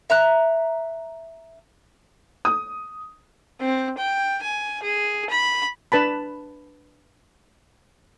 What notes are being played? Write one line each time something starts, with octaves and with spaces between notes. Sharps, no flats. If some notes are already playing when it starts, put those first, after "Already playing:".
E5 A#5 F#6
D#6
C4
G5
G#5
G#4
B5
D4 B4 A5 B5